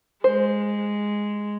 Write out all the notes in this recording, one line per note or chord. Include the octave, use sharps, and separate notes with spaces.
G#3 C5